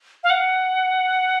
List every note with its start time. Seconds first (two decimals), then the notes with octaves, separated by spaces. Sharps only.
0.24 F5
0.30 F#5